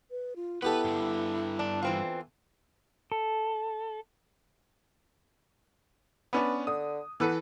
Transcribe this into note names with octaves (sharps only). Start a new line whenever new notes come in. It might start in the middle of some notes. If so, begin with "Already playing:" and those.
B4
F4
B3 E4 G4 A4 B4
G2 D3
D4
E3 C4 F4
A4
B3 C#4 D4 B4
D3 D#6
E3 B3 A4 B4